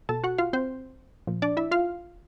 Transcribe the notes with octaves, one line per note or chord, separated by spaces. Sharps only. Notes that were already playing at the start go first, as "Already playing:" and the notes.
B2 A4 A5
F#4 F#5
F4 F5
C4 C5
A#2 F3
D4 D5
E4 E5
F4 F5